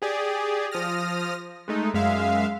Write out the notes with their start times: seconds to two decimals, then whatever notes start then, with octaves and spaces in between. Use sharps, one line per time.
0.02 G4 G#4 D5
0.71 F3 D#6 F6 A#6
1.68 G#3 A3 D#4
1.94 F#2 G#3 E5 F5